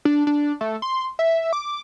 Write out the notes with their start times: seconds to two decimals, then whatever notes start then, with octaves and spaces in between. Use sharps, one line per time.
0.05 D4
0.27 D4
0.61 A3
0.82 C6
1.19 E5
1.53 D6